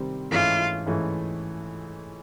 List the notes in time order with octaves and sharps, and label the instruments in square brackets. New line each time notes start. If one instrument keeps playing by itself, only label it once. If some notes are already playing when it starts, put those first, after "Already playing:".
Already playing: [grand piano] C3 D#3 G3 C4
[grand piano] G#2 E3 A3 C#4 [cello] F4
[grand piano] G#2 E3 A3 C#4